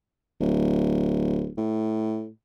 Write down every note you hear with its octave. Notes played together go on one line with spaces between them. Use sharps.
D1
A2